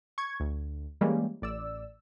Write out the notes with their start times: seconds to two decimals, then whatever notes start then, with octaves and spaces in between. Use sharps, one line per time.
0.18 C#6 G#6
0.40 D2
1.01 E3 G3 G#3 A#3 C#4
1.42 A1 D5 E6